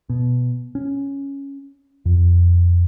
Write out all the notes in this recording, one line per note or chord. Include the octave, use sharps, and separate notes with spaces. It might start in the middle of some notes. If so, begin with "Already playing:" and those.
B2
C#4
F2